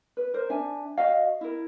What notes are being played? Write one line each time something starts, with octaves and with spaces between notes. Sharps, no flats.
B4
A#4 C5
D4 E5 G#5
F#4 D#5 F5
E4 A#4